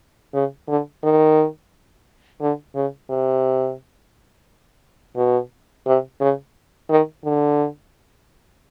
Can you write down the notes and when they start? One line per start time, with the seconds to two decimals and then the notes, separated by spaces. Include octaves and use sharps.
0.34 C#3
0.68 D3
1.03 D#3
2.41 D3
2.75 C#3
3.10 C3
5.17 B2
5.87 C3
6.21 C#3
6.90 D#3
7.25 D3